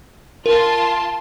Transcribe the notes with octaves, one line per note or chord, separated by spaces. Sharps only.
F4 A#4 A5 C6